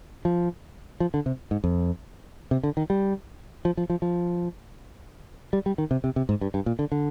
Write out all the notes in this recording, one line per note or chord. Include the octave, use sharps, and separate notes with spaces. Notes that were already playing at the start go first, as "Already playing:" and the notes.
F3
F3
D3
C3
G#2
F2
C3
D3
D#3
G3
F3
F3
F3
F3
G3
G3
D#3
C3
C3
C3
G#2
G2
G2
A#2
D3
D3